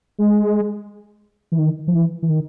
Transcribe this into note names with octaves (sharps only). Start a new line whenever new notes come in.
G#3
E3
D#3
F3
E3
E3
D#3